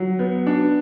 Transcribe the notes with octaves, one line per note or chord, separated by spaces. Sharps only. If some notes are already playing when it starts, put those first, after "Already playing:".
Already playing: F#3
B3
D4